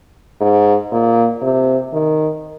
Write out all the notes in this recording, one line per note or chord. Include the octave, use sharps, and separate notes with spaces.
G#2
A#2
C3
D#3